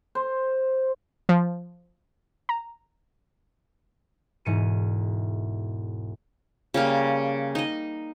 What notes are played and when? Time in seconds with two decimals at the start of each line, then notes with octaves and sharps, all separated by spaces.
0.15 C5
1.29 F3
2.49 A#5
4.45 E1 G#2 C#7 D#7
6.74 C#3 G3 A#3
7.55 D#4 D#5